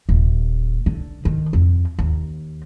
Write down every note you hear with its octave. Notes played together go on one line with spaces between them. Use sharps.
D#1
D3
D#3
F2
D#2